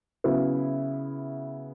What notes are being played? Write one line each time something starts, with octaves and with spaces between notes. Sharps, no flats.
C#3 F#3 B3 E4